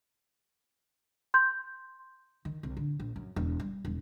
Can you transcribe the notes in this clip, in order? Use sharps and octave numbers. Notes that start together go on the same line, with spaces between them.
C6 G6
D#3
C2
D3
A#1
F#2
E1
G3
E1